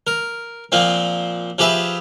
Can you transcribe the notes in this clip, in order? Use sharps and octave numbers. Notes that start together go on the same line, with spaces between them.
A#4
A#2 F3 A#3 C4
F3 G4 G#4 B4 E5